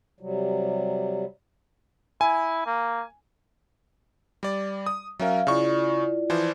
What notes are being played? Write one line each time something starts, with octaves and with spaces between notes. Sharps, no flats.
C3 F#3 G3
E4 G#5
A#3
G3 D5
D#6
F#3 C#4 A#4 E5 F5
C#3 E4 F4 D5 C#6
E3 F3 C5